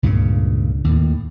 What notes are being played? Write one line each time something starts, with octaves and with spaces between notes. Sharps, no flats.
C#2 G2 A#2 C#3
D#2 A2